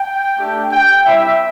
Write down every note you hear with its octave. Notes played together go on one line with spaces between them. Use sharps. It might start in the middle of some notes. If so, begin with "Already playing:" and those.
Already playing: G5
A3 D4 G4
G5
G3 C4 E4 G4 E5